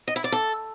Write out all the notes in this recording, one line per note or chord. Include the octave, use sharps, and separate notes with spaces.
D#5
E4
D5
A4